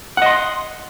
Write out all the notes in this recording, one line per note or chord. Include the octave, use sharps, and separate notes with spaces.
D#5 F#5 C6